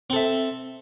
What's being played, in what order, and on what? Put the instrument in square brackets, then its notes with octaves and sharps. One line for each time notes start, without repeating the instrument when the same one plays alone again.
[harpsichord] C4
A4
E5